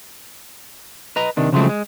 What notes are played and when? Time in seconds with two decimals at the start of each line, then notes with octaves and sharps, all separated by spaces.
1.16 B4 D#5 A#5
1.37 C3 D#3 D4
1.53 C#3 F3 F#3 G#3 A3 C4
1.69 G#3